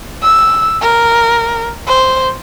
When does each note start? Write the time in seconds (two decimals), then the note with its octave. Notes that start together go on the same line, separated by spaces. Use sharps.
0.23 E6
0.81 A#4
1.87 C5